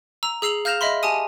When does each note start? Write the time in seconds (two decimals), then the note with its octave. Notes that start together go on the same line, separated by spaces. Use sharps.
0.23 A#5 E6
0.42 G#4 E6 C7 F7 F#7
0.65 F5 F6 G6 A#6 E7 F7
0.81 D#5 E5 B5 C6
1.03 G4 G#5 A5 D#6 D#7